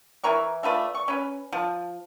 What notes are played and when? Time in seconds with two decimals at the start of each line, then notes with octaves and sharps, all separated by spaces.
0.24 E3 E4 A#4 C#6
0.63 A3 F4 B4 D5
0.95 C#6
1.08 C#4 B4
1.53 F3